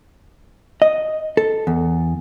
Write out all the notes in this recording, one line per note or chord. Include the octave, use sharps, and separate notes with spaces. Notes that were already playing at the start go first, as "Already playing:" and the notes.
D#5
A4
E2